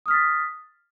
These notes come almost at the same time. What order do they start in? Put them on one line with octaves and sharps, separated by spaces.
D#6 F6 B6 A6